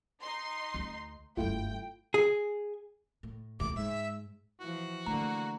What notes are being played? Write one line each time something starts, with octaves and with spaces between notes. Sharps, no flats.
D#4 C6
D2
F#1 G2 A3 E4 F4 G5
G#4
A2
D#1 C2 A3 D6
G#2 G#3 E5
E3 F3 F#4
D3 A3 A#3 A#5